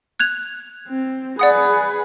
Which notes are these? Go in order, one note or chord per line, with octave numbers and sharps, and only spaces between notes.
F#6 G#6 F7
C4
G#4 B4 D5 F#5 D#6